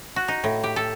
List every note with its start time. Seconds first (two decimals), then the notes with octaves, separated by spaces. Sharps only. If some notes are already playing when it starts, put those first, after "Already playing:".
0.16 F#4
0.28 D#4
0.44 A2
0.63 G4
0.76 A4